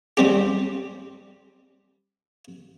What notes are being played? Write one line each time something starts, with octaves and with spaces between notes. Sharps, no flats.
G3 C4 G4